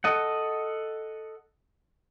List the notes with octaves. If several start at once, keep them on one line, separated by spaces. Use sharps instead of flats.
A4 D#5 F#5